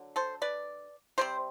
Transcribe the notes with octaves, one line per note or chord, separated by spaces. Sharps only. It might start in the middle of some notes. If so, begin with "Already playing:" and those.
Already playing: D3 F#3
A4 C5
B4 D5
C3 G3 C4 C5